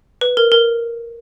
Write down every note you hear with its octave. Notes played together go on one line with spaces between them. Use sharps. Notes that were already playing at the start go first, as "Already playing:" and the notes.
B4
A#4
A#4